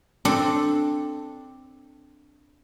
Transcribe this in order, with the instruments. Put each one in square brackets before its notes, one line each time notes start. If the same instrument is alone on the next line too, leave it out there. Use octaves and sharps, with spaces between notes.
[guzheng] C4 D4 A4 A5